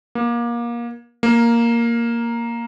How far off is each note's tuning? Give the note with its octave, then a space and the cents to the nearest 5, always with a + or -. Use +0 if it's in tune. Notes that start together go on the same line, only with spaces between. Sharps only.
A#3 +25
A#3 +0